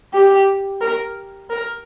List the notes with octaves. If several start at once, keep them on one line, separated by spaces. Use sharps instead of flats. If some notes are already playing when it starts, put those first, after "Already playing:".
G4
A#4
A#4